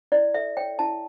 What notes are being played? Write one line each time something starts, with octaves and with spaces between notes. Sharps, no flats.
E4 D5
A4 E5
C#5 G5
E4 A5